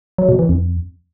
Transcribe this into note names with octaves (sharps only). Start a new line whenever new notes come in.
F#3
B2
E3
F2